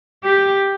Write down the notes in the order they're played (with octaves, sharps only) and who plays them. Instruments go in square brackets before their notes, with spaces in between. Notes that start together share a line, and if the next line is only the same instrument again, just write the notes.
[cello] G4